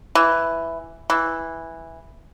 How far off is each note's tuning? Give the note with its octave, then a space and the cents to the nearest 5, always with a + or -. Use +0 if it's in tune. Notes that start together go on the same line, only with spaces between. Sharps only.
E3 +5
E3 -5